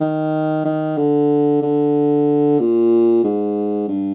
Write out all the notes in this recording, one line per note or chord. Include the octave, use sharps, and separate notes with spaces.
D#3
D#3
D3
D3
A#2
G#2
G2